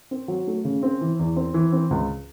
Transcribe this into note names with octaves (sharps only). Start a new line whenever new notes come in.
C4
F#3
A3
C#3
C4
E3
E2
C4
E3
C4
C#2